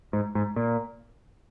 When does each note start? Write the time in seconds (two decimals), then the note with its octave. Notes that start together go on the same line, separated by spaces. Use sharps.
0.13 G#2
0.35 G#2
0.56 A#2